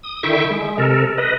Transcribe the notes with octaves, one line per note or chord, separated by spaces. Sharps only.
D#6
D3 D#3 E4 E5 G5 C#6
G#3
C3 A4 A#4
B4 D#5